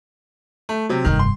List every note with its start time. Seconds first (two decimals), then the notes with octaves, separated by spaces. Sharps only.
0.69 A3
0.89 C3 F#3
1.05 F1 G2 D#3
1.19 C6